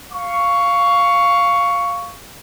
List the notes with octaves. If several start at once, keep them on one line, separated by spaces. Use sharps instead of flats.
F5 C#6